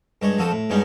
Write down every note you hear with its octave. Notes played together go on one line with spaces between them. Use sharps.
G2 G#3 C#5
F2 F3 F#4 A4 D#6
A2
G2 B2 G#3 C#4 D#4